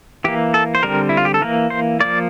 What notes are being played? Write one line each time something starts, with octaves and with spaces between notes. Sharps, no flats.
E3 A#3 G4
A4
C5
D3 G3 C4 A#4
E4
F4
G4
A4
E3 A#3 A#4
C5
F3 A#3 D5